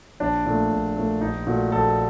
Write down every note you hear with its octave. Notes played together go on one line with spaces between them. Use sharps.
A#1 D4
A#2 A3
A#1
A#2 A3
A#1 D#4
A#2 A3 F#4
A#1 A4